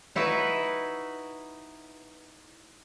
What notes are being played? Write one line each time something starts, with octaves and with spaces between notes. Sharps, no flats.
D#4 E4 F#4 B4 E5